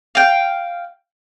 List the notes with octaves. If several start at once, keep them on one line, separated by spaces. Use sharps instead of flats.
F5 G5